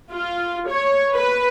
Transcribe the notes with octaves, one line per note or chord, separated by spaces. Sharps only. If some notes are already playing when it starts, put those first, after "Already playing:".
F4
C#5
B4